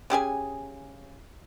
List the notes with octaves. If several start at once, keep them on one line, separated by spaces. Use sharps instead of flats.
C#3 G4 G#4 G#5